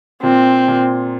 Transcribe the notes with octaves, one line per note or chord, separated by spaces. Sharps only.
A#2 C4
A#2